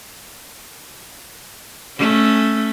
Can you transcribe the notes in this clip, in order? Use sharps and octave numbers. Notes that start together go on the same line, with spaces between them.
A3 C#4